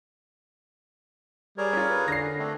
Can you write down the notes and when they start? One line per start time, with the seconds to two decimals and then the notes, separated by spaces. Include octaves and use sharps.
1.58 G3 G#4 A#4 C#5
1.73 C#4 F4
1.89 B4
2.08 D3 A#6 C7
2.39 A3 C4 D4